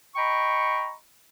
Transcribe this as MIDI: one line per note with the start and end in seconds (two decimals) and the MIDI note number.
0.16 0.93 75
0.16 0.93 79
0.16 0.93 82
0.16 0.93 83
0.16 0.93 85